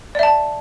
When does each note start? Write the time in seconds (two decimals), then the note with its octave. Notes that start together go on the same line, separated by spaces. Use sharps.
0.15 D5
0.19 E5
0.23 A5